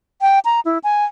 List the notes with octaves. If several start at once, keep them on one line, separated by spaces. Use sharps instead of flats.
G5
A#5
E4
G#5